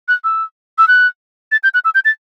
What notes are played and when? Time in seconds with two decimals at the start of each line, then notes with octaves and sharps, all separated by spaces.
0.08 F#6
0.24 E6
0.78 E6
0.88 F#6
1.52 A6
1.63 G6
1.74 F#6
1.85 E6
1.95 G6
2.05 A6